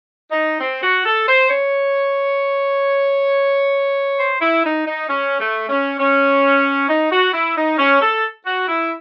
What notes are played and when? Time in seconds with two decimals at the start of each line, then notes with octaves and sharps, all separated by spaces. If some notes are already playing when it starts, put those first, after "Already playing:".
0.31 D#4
0.61 C4
0.83 F#4
1.06 A4
1.28 C5
1.50 C#5
4.19 C5
4.41 E4
4.65 D#4
4.87 D#4
5.09 C#4
5.40 A3
5.69 C#4
5.99 C#4
6.89 D#4
7.11 F#4
7.33 E4
7.56 D#4
7.78 C#4
8.01 A4
8.46 F#4
8.68 E4